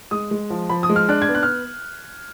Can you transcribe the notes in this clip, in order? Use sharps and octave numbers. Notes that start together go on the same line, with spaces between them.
G#3 D#6
G#3
F3
F3 B5
D#6
G#3
F6
D4 F#6
G#6
B3
F#6
F6